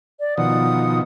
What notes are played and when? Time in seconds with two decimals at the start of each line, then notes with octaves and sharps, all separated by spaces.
0.18 D5
0.38 B2 D#3 F3 F#5 D#6